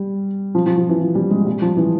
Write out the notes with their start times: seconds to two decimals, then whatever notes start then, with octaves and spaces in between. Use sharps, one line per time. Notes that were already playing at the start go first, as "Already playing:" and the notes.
Already playing: G3
0.55 F3
0.66 F3
0.77 F3
0.89 E3
1.01 F3
1.15 G3
1.31 G#3
1.46 G3
1.62 F3
1.77 E3